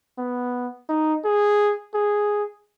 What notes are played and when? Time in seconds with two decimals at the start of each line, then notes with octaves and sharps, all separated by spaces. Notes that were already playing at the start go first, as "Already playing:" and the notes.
0.18 B3
0.89 D#4
1.25 G#4
1.94 G#4